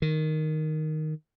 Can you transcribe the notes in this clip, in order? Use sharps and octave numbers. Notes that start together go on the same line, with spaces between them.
D#3